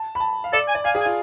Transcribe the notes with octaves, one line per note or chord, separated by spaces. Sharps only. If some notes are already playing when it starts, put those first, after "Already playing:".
Already playing: A5
B5
A5
F5
A4 D5
G#5
D5
F5 G#5
G#4
G#5
F4